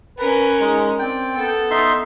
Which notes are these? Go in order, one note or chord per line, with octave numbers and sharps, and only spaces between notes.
C#4 A#4 B4
G#3 D#4
C4 D5 G5
B3 A4
D#4 E5 C6